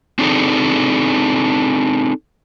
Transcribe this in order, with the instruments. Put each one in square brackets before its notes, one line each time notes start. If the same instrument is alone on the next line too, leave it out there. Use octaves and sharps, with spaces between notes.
[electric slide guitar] C4 D4 D#4 G#4 A4